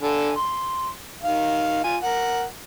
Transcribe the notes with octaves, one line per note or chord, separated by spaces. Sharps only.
D3 A4 G#5
C6
D#3 F5
F4 G#5
A#4 F#5